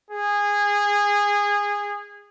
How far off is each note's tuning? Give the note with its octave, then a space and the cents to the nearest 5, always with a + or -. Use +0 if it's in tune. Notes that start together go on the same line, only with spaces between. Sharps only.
G#4 -20